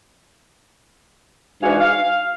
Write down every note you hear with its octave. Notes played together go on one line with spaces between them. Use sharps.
G#2 E3 D4 F#4 G#4 F5
F5